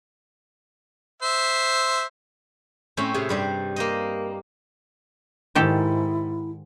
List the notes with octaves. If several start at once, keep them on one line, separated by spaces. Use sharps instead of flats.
C5 E5
A2 A3 C4 C#4 C5
A2 C3 G#4
G2 G3 C5
A#3 C5 D#5
G#2 D#3 E4 G4 A4